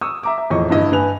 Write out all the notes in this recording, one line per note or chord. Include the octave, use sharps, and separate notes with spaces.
C#6 D#6 E6
E5 A#5 D6
E5
E1 F2 A2 D#5 C#6
G2 D3 E4 D#5
G2 B4 G#5 F7